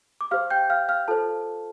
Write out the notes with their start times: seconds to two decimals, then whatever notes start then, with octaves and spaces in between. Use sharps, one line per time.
0.21 D6
0.31 G4 C5 F5 F6
0.50 G5 G6
0.70 F5 F6
0.89 F5 F6
1.08 F4 A4 C5 A5